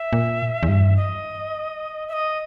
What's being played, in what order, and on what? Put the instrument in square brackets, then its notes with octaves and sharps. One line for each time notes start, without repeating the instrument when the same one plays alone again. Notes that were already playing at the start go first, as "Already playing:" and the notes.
Already playing: [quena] E5
[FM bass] A#2
E2
G2
[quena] D#5
E5
D#5